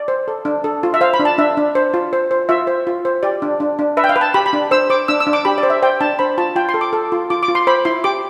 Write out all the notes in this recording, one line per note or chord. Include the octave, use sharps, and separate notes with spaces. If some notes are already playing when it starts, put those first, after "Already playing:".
Already playing: D5
C5
A4
D4
A4
F4
E5
C5 F5
B5
D4
A5
D4 E5
D4
C5
F4
C5
C5
F4 E5
C5
F4
C5
G4 D5
D4
D4
D4
B4 E5
G5
F5
B4
A5
G4 B5
B5
D4
C5 E6
C5 D6
D4 E6
E6
D4
D6
G4 B5
D5
C5
E5
C5 G5
D4 A5
C5 B5
F4 A5
F4 G5
C6
A4
D6
A4
F4
F4 D6
D6
F4
C6
C5 B5
E4 C6
G4 D6